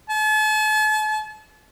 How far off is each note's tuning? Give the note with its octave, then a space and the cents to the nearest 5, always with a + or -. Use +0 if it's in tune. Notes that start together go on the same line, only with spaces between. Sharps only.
A5 -40